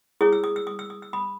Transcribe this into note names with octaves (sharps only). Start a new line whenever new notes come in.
E4 G#4 C#5 D#6
E6
D#6
E6
D#6
E6
D#6
E6
B5 D#6